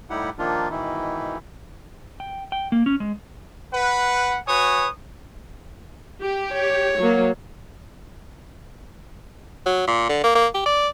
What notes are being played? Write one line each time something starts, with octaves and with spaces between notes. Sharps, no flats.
A2 G3 D#4 E4 G4 F#5
D#3 F3 A#3 D4 D#4 F4
G#2 B2 D#3 E3 D#4 E4
G5
G5
A#3
C#4
G#3
B4 F#5
F#4 B4 C#5 G#5 D#6
G4
C#5
F#3 A#3
F#3
A#2
D3
A#3
A#3
G4
D5